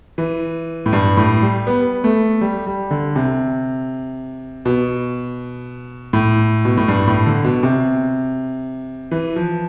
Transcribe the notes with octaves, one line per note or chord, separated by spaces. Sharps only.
E3
A2
G2
A2
G3
B3
A3
G3
G3
D3
C3
B2
A2
B2
A2
G2
A2
D3
B2
C3
E3
F3